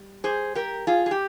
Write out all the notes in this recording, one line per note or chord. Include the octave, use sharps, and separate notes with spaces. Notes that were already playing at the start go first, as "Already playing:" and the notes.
Already playing: G3
G#4 C5
G4 A#4
F4 G#4
G#4
G4